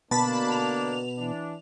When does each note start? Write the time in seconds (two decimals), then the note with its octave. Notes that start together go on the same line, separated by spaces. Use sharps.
0.11 B2 D3 A#3 D4 A5 B5
0.52 F7
1.19 E3 D4